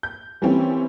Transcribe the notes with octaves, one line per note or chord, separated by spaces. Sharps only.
G6
E3 G3 A#3 C4 C#4 E4